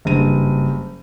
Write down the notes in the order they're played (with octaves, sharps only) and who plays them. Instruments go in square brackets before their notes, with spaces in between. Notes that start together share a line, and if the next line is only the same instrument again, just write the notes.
[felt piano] F#1 G2 D#7